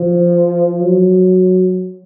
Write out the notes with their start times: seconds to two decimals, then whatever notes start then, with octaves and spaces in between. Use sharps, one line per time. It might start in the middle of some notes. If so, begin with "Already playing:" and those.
Already playing: F3
0.80 F#3